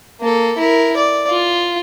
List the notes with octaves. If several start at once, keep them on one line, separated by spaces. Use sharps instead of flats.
A#3 A4
E4 A#4
D5
F4